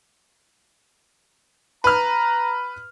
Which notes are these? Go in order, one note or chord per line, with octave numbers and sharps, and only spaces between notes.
B4 A#5 F6